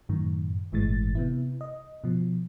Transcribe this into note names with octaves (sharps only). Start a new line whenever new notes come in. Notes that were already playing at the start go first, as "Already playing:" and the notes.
F#2 A2 D#3
G1 A2 E3 G#3 A6
C3 B3 E4
D#5
B2 F3